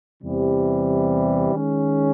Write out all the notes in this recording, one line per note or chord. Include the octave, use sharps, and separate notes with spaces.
E2 C3 E3 G3
D#3 G#3 C#4